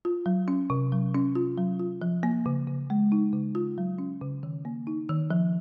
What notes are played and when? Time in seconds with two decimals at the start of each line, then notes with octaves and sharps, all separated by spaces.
0.05 F4
0.26 F#3
0.48 C#4
0.70 C3
0.92 F#3
1.15 C#4
1.35 F4
1.58 F#3
1.80 F4
2.02 F3
2.23 A#3
2.46 C#3
2.67 C#3
2.90 G#3
3.12 D#4
3.33 C#3
3.55 F4
3.78 F#3
3.99 C#4
4.21 C#3
4.43 D#3
4.65 A#3
4.87 D#4
5.09 D#3
5.31 F3